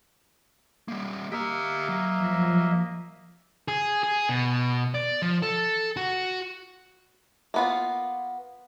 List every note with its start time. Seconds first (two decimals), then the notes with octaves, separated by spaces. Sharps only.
0.88 G3 A#3
1.32 A#3 G4 D#5 E5 A#5
1.89 F#3
2.18 F3
3.68 G#4
4.03 G#4
4.29 B2
4.94 D5
5.22 F3
5.42 A4
5.97 F#4
7.54 A#3 B3 F4